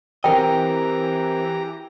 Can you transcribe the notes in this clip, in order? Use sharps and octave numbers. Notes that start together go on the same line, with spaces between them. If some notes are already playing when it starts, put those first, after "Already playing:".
E3 C4 G4 A#4 D#5 G5 A#5